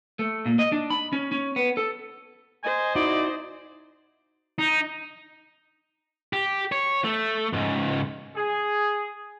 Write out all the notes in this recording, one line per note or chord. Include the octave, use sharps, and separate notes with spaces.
A3
A#2
D#5
D4
B5
C#4
C#4
B3
A4
C5 D#5 G#5
D#4 E4 F#4 D5
D#4
G4
C#5
A3
C#2 G#2
G#4